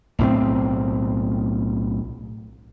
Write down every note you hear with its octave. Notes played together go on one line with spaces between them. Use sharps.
B1 A2 G3 C4